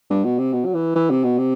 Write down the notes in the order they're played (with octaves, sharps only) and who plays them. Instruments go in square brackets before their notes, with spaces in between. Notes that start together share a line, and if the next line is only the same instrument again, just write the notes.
[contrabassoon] G2
B2
C3
B2
F#3
E3
E3
C3
B2
C3